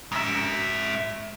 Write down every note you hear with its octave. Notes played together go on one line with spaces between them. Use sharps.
G#2 E5